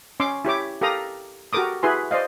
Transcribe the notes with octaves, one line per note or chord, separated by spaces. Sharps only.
C#4 C6 D6
E4 G4 C#5 D6
G4 A4 A#4 F5 A#5 D#6
F#4 G4 A4 A#4 D6 D#6
E4 F#4 G#4 B4 G#5 C6
C5 D5 D#5 F5